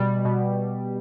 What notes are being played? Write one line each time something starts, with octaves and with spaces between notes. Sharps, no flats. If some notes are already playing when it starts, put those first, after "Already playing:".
Already playing: B2 G3
B2